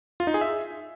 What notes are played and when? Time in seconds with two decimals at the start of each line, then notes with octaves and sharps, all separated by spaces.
0.20 F4
0.27 D#4
0.34 G#4
0.41 E5